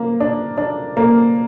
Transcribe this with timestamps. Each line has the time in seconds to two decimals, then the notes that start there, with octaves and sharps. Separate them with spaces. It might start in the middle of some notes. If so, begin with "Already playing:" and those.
Already playing: A#3
0.20 D4
0.58 D4
0.97 A#3